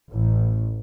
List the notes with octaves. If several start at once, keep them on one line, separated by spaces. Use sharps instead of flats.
A1